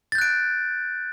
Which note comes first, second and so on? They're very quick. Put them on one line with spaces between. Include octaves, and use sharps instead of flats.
A6 G6 F#6 D7